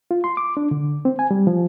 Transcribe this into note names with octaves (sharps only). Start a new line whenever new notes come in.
F4
C6
D6
D4
D3
C4
G#5
G3
F3